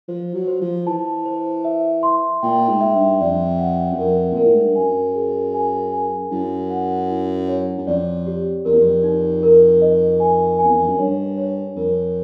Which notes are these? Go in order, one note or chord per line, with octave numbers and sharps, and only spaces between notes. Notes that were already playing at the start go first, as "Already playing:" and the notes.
F3 C5
F#3
C5
F3
E3 A5
C5
E5
C6
A#2 G5
G#2
E5
G2
F2 D5
F#5
F#2
F2 A#4
A#2 A#4
A2
G#2
G2
F#2 G#5
G#4
G#5
G#5
F#2 E4
F#5
E4
C#5
F#2
F2 D5
G4
F2 A#4
E2
F2
D#4
A#4
D#5
G#5
G#5
E2
F2
F#2
G2 C#5
C#5
F2 A#4